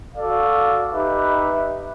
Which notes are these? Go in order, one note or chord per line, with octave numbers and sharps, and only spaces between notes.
F#4 A4 D5 F5
D#4 G4 B4 E5